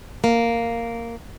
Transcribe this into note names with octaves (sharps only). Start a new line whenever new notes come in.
A#3